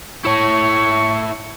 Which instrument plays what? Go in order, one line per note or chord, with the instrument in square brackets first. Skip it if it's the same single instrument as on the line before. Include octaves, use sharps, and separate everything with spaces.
[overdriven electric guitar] E4 C#5 [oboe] C#6